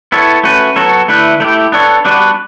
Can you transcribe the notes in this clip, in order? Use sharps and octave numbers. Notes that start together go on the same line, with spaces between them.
B3 E4 A4 C#5
A3 C#4 F#4 B4
F#3 B3 F#4 A4 C#5
D3 A3 E4 B4
A3 E4 G4
B3 D4 A4 C#5
G3 B3 D4 F#4 B4